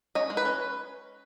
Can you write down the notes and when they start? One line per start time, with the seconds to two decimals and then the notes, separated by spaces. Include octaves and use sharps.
0.15 C#4 D#5
0.30 G#3
0.37 B4
0.45 C#4